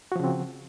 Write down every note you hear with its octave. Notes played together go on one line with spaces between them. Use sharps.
C#3 F3 C4 F#4